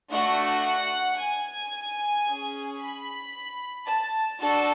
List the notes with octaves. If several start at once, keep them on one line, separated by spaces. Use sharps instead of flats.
A3 D4 F#4 F#5
F#5
G#5
C#4 G#4
B5
A5
D4 F#4 A4 A5